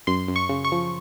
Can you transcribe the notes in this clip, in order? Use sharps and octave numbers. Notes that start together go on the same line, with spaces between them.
F#2 C6
F#2
C#6
C#3
C#6
F3